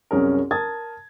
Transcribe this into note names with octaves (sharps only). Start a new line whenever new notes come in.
C2 F#2 C#4 G#4 A#4
A#4 A5 D#6 G#6 A6